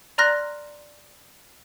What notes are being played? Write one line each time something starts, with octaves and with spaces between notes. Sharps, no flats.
D5 A#5 C6 F6 F#6 A#6